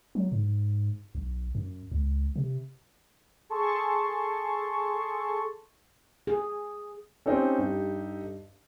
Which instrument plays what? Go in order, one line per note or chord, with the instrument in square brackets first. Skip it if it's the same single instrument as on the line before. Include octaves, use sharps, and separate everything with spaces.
[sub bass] F#3
G#2
B1
F#2
C#2
C3
[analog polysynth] G#4 A4 A5 C6 C#6
[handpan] G#4
[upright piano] C4 C#4 [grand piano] D#4 G4 A4
[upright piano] G2